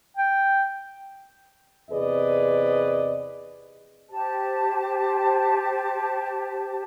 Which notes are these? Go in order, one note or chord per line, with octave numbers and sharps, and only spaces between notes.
G5
E2 C3 G#4 B4 D5 D#5
G4 C5 A5